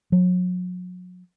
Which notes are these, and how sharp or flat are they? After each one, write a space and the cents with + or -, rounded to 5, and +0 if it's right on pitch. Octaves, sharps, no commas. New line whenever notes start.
F#3 -35